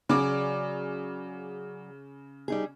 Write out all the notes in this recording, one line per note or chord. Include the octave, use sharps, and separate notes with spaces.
C#3 F#3 G#4 D5 D6
G3 D#4 G#4